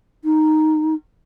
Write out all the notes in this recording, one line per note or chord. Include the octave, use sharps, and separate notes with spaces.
D#4